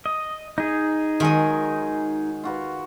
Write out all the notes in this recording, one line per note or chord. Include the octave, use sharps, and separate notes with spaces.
D#5
D#4 G#4 D#5
D#3 F#3 G#3 D#5
F4 F#4 B4